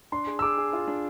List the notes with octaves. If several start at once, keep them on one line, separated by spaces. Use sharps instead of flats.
D4 C6
G#4
E6
G#4 D6
G#4
F4
D4